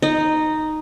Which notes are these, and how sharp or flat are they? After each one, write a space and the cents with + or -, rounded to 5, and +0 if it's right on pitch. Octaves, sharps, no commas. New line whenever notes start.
D#4 +0 D#5 -20